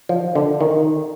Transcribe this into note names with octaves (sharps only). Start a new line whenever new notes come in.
F3
D3
D#3